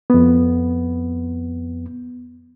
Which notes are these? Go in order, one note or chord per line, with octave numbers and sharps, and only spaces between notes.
F2 B3